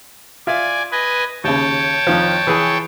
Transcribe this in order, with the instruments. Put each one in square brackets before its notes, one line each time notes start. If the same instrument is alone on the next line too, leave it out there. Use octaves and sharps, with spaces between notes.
[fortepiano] F4 E5 [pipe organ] D5 G#5
[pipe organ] B4 D#5 G#5
[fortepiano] D#2 C#3 [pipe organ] C#5 G5 A5
[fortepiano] F2 D#3 F3
E3 G#4 G#5